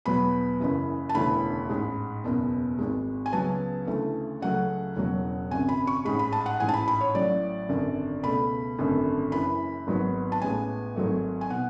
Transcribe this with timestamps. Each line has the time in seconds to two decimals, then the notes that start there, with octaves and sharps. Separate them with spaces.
0.06 E2 B2 F#3 B3 B5
0.60 F#1 F#2 C#3 E3
1.09 A5
1.15 E1 D2 C#3 E3 B5
1.69 A1 G#2 G#3
2.24 F#1 E2 B2
2.79 G#1 G#2 G#3
3.26 G#5
3.33 C#2 C#3 F#3 B3 A5
3.87 D2 C#3 E3 A3
4.42 C#2 C#3 F#3 A3 F#5
4.96 E1 E2 C#3 F#3
5.51 G#1 F#2 C#3 G#5
5.69 B5
5.87 C#6
6.05 A1 G#2 G#3 B5
6.19 B5
6.32 A5
6.46 F#5
6.60 A1 G#2 E3 G#5
6.69 A5
6.73 B5
6.88 B5
7.01 C#5
7.14 A1 A2 F#3 D5
7.69 G#1 F#2 D3
8.23 C#2 B2 A3 B5
8.78 G#1 F#2 D3 A3
9.32 F#1 F#2 E3 B5
9.87 G#1 G#2 F#3 B3
10.32 A5
10.42 A1 A2 G#3 B3 G#5
10.96 G#1 G#2 F#3 A3
11.41 G#5
11.50 B2 F#5